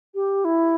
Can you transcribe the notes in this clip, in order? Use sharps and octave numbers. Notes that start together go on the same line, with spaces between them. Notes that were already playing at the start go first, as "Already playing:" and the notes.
G4
E4